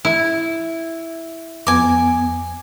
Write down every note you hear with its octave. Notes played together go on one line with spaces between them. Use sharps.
E4
F2 B3 G#5 D6